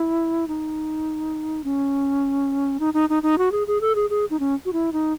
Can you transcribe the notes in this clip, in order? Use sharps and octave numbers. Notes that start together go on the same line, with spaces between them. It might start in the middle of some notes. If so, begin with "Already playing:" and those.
Already playing: E4
D#4
C#4
D#4
D#4
D#4
D#4
F#4
G#4
G#4
A4
G#4
G#4
D#4
C#4
F#4
E4
D#4